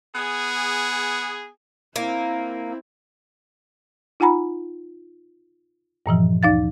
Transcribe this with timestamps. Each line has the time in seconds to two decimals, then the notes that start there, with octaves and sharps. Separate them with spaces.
0.15 B3 G#4
1.96 A#3 C4 E4
4.20 D#4 F4 F#5 G#5 A#5 B5
6.06 G2 A#2 E3 F3
6.43 D2 D#4 F5 A6